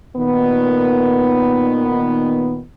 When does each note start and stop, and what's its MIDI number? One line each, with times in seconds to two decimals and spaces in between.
0.16 2.61 46
0.16 2.61 51
0.16 2.61 59